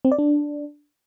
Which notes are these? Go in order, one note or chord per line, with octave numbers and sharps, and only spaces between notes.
C4
D5
D4